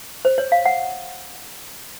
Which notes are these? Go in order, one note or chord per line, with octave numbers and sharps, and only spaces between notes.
C5
C#5
F5
F#5